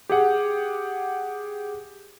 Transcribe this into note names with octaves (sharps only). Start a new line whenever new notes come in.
G4 G#4 F#5